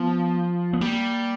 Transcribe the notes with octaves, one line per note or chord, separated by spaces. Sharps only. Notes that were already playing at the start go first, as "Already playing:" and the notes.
Already playing: F3 B3
B3
G3 A#3